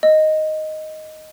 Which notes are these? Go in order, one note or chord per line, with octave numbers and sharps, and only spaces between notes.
D#5